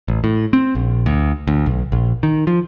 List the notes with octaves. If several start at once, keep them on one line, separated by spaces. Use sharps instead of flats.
A1
A2
C4
A#1
D2
D2
B1
A#1
D#3
F3